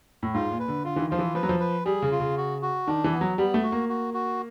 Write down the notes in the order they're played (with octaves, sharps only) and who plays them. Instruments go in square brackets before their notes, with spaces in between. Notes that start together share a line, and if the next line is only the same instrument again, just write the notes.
[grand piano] A2
[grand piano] G#2 [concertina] F4
[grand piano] A#2
[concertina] B4
[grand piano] D3
[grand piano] D3 [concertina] F4
[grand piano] E3
D#3
[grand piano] F3 [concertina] F4
[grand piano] E3
[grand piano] F3 [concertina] B4
[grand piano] F#3
F3
[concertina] B4
[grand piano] G3 [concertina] G#4
[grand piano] C#3
[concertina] F4
[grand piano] C#3
[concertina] F#4
F#4
[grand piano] D#3 [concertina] D4
[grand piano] E3
[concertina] B3
[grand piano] F#3
[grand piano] G3 [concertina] B3
[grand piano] A3
[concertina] F#4
[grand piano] A#3
[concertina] F#4
F#4